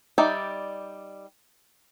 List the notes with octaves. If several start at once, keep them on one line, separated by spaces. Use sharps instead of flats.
G3 D#4 D5 E5 G5